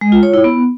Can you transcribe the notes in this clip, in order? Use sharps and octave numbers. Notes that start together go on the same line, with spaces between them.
G#3
F4
C#5
E4
B3